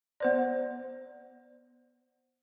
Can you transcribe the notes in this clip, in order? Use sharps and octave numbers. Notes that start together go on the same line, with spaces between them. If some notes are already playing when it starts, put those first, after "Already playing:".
B3 C5 D5